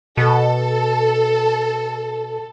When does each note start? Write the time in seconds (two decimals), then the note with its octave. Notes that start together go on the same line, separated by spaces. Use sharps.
0.17 B2 A4